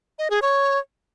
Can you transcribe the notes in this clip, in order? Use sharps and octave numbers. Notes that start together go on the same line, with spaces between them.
D#5
G#4
C#5